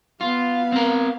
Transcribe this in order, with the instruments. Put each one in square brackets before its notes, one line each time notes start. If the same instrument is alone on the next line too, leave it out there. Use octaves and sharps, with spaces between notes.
[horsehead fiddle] B3 F5 [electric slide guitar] F4
[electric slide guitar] C4 A#4